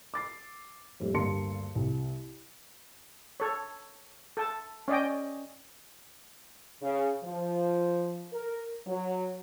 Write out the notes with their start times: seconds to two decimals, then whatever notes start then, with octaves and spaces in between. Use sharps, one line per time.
0.14 D6 A6 C7
1.00 F2 A2 G3 A3
1.14 D2 G2 A#3 A5 C6 C#7
1.75 C2
3.40 A4 C#5
4.37 A4 A5
4.88 C#4 D5 D#5 G5
6.82 C#3
7.24 F3
8.33 A#4
8.87 F#3